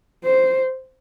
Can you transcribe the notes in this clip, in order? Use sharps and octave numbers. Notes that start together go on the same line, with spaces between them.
C5